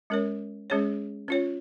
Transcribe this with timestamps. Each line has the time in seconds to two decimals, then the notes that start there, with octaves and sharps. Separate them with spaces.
0.10 G#3 C#4 A#4 C#5
0.70 G#3 C#4 G#4 C#5
1.28 C#4 F4 C#5